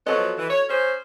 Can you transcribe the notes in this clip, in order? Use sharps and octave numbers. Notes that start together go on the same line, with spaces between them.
F3 F#3 B3 F#4 A4 D#5
E3
C#5
C#4 G#4 C5